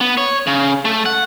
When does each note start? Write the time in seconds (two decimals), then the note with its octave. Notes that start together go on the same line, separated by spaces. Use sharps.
0.01 B3
0.17 C#5
0.47 C#3
0.85 A3
1.06 F#5